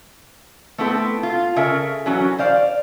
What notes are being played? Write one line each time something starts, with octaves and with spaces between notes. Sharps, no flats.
A3 B3 C4 E4 A4
F4
C#3 A4 A#4 E5
E3 F#3 C#4 F#4
C5 D5 F5